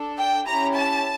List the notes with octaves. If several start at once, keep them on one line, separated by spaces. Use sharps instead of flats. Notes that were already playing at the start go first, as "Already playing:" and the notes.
Already playing: D4 A4
G5
C#4 E4 G4 A#5
A5